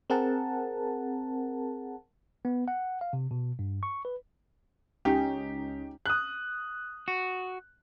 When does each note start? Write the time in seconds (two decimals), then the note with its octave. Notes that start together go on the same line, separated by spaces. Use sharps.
0.10 C4 G#4 A#4 F#5 A5
2.45 B3
2.68 F#5
3.01 F5
3.13 C3
3.31 B2
3.59 G2
3.83 C#6
4.05 B4
5.05 C#2 C#4 D#4 G4
6.06 D#6 F#6
7.08 F#4